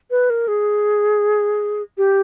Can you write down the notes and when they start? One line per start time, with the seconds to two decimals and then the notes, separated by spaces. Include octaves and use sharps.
0.11 B4
0.30 A#4
0.48 G#4
1.98 G4